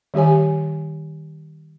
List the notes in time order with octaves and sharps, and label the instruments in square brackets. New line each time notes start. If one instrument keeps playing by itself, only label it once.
[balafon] D#3 G3 G4 C#5 G#5